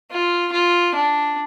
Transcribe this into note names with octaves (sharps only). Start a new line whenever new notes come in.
F4
F4
D4